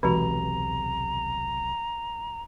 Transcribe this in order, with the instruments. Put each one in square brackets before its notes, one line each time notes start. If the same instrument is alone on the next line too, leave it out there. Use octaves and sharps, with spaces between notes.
[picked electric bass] D#1 B1 C3 [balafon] E3 G#3 F#4 [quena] A#5